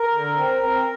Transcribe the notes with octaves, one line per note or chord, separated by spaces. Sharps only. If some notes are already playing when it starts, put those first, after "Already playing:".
Already playing: A#4
D3
C4
C4